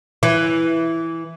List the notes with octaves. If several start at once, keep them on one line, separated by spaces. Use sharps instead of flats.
E3